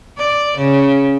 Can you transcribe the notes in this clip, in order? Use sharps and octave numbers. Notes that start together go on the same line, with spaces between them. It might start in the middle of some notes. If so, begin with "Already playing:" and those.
D5
C#3